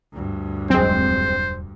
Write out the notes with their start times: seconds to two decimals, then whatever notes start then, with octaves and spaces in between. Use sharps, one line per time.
0.13 D2 G2
0.70 E1 F#3 G#3 C4 C5